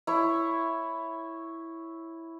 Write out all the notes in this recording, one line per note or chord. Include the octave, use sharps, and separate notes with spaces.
E4 C#5